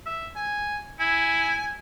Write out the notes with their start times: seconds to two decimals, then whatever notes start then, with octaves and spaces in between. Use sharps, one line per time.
0.06 E5
0.36 G#5
1.00 E4 G#5